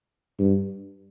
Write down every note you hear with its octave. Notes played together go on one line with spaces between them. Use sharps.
G2